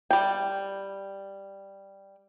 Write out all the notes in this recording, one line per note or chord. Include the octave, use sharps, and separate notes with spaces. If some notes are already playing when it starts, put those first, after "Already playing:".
G3 G5